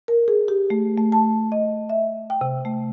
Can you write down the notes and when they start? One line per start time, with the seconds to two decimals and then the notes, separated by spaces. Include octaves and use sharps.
0.08 A#4
0.28 G#4
0.48 G4
0.70 A3
0.98 A3
1.12 A5
1.52 D#5
1.90 E5
2.30 G5
2.41 C3
2.65 A3